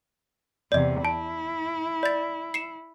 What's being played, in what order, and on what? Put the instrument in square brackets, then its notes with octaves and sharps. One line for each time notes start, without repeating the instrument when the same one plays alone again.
[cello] E2 C3 [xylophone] D5 D#5
[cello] E4 [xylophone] A5
[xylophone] D5 A6
C7 C#7 E7